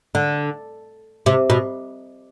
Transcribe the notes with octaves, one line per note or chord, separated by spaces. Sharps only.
D3
C3
B2